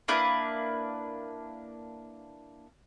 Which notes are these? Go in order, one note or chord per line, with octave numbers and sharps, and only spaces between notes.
A#3 D4 E4 B4